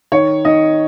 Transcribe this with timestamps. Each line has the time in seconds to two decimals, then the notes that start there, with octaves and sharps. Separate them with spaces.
0.12 D#3 C#5
0.45 D#3 D#5